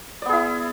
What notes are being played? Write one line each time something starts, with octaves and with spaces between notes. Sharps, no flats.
B3 E4 G#4 D5